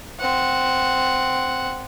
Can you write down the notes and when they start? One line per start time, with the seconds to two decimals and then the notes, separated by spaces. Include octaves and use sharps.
0.20 C4 F#5